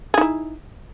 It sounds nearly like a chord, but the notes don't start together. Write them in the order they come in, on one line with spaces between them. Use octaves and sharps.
G#4 D#4 E4